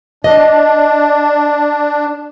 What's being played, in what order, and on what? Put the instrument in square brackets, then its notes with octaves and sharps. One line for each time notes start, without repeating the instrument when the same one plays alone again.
[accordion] D4 [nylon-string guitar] D#5